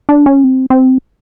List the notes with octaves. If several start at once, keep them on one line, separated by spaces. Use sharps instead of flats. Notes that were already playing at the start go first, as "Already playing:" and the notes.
D4
C#4
C4
C4